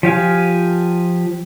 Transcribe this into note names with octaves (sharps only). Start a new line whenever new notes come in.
F3 G4 F5 G#5